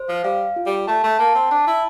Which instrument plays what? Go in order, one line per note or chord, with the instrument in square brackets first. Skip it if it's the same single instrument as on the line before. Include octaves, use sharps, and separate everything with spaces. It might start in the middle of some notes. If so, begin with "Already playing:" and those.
Already playing: [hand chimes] C5
[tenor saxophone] F3
[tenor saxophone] G3 [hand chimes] F5
[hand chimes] F4
[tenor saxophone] G3
[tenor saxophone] A3 [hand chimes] A5
[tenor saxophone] A3
[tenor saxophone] A#3 [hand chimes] A5
[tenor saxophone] C4
[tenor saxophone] D4 [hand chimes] A5
[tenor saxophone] E4